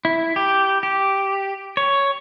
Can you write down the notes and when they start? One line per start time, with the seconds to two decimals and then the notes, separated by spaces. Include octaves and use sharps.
0.05 E4
0.36 G4
0.83 G4
1.77 C#5